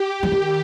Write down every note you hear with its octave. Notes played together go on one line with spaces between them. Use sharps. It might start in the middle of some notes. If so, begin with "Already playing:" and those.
Already playing: G4
F3
D#3